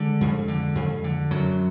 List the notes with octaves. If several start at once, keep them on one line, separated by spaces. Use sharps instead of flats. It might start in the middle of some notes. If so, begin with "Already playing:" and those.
Already playing: D3 G#3
F2
D3
F2
D3
F#2 F#3